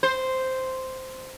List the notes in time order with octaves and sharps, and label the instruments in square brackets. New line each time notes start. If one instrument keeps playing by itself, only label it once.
[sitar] C5